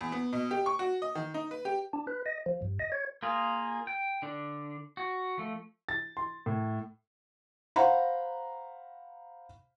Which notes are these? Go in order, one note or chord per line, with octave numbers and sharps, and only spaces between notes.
E2
B3
B2
G4
C#6
F#4
D#5
D#3
D#4
B4
G4
D4
B4
D#5
F3
G2
D#5
C#5
A#3 F4 G#4
G5
D3 D4
F#4
F3 A3
A6
C6
A2
C5 F5 F#5 A#5 B5